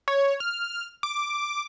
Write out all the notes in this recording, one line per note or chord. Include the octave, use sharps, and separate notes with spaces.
C#5
F6
D6